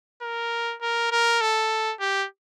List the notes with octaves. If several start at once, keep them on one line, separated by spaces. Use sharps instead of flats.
A#4
A#4
A#4
A4
G4